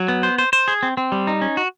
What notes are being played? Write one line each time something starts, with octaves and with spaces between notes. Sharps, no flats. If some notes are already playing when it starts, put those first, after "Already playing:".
Already playing: F#3
B3
C5
C5
C5
G#4
C4
C4
G3
D#4
C#4
F#4